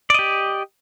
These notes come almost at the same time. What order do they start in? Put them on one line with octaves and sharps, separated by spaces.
D5 D#5 G4